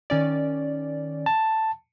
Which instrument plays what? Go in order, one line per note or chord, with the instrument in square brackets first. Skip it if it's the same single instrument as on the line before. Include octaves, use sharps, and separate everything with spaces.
[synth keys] D#3 C#4 D5
[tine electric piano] A5